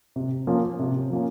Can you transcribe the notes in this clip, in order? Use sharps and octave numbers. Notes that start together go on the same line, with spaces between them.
C3
F3 A#3 C#4
C3
F3 A#3 C#4